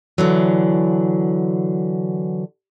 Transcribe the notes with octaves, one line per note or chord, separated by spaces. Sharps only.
D3 E3 F#3